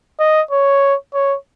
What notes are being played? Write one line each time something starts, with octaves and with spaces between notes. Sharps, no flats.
D#5
C#5
C#5